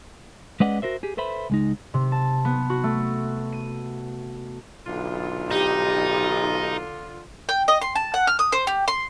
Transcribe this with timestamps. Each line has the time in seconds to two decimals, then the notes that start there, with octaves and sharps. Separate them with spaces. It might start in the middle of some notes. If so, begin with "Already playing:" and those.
0.60 G#3 C#4 B4 D5 D#5 F#5
0.82 F#4 A#4 C5 E5
1.03 G4 G#4
1.17 A4 B4 C5 E5 B5
1.50 C#2 G#3 D#4
1.94 C3
2.12 A5
2.45 B3
2.70 F#4
2.83 A3
3.52 D#7
4.86 B1 D3 F4
5.51 D#4 G4
7.49 G5
7.68 D#5
7.82 C6
7.95 A5
8.14 F#5
8.27 F6
8.39 D#6
8.52 C5
8.67 G4
8.88 C6